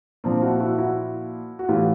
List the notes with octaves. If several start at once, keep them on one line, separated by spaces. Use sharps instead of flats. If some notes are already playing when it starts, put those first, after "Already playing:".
A#2 F3 C4 D4
E4 F#4
E4 F#4
E4 F#4
F#4
A2 E3 F4 G4